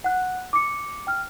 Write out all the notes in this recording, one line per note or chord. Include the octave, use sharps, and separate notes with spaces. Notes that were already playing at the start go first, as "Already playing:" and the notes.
F#5 F#6
D6 C#7
G5 F6